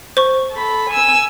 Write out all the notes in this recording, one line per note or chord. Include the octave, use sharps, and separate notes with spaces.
C5 C#6
A4 B5
G#5 E6